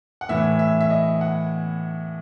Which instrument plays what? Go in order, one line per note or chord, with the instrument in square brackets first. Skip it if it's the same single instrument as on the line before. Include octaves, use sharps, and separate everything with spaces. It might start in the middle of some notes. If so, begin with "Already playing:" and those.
[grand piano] F#5
A2 E3 E5
E5
E5
D#5
F#5